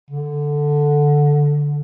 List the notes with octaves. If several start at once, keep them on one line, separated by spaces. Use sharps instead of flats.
D3